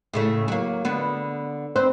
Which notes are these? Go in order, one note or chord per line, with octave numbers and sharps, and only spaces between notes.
A2 C#3 A3
F#3 A#3
D3 B3
C4 B4 C5